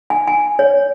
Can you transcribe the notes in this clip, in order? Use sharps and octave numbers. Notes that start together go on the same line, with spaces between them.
G#5
G#5
C#5